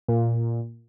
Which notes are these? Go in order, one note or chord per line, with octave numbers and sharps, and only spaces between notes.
A#2